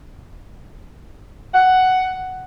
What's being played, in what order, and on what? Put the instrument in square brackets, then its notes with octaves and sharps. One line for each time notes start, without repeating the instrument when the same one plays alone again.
[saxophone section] F#5